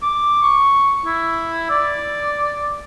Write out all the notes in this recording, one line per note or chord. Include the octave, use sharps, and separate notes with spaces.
D6
C#6
E4
D5